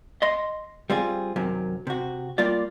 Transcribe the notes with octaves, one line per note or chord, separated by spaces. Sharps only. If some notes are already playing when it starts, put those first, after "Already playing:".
D#5 C6
G3 C4 F4 G#4
F#2 C3 D#3 F#3
C3 F#4
G3 A#3 F4 D5